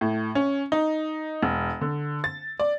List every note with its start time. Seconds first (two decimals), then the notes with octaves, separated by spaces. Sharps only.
0.01 A2
0.35 C#4
0.72 D#4
1.43 E1
1.81 D3
2.24 A6
2.60 D5